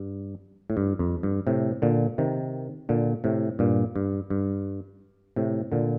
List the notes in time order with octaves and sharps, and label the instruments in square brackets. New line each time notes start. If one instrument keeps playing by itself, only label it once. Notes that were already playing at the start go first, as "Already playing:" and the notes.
Already playing: [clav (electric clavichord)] G2
A2
G2
F2
G2
A2 C3
A#2 D3
C3 D#3
A#2 D3
A2 C3
G2 A#2
G2
G2
A2 C3
A#2 D3